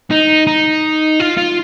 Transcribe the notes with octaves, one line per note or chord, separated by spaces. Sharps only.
D#4
D#4
F4
F4